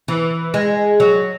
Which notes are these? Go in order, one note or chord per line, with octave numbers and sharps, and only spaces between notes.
E3
G#3
F#3